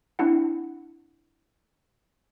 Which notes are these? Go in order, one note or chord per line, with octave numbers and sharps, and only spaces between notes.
C4 D4 E4 F#5